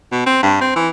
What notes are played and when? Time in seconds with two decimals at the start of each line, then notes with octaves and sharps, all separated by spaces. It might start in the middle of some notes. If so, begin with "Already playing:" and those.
0.12 B2
0.26 C4
0.43 G2
0.61 C4
0.76 E3